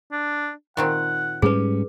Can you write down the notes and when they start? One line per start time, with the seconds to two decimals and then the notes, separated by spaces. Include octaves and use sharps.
0.12 D4
0.77 A#2 D#3 C4 F#5
1.42 G#2 G3 C#4 G#4 B4